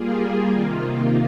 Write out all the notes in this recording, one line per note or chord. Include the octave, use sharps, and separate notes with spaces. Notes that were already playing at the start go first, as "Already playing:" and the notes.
Already playing: G3 A#3 F4 G#4
C3 D#3 A#3 F4